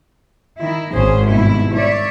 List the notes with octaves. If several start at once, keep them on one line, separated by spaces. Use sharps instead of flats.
D#3 E4
G#1 C#4 G#4 C5
G2 B2 E4
C#5 D5 E5